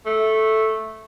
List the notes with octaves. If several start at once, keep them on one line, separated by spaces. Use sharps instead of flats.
A3